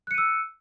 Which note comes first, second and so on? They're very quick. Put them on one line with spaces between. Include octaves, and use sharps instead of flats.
F#6 C#7 D#7 E6